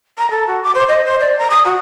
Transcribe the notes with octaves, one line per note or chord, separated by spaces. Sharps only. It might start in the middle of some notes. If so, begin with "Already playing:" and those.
A#5
A4
F#4
D6
C5
D#5
C5
D5
A#5
D#6
F#4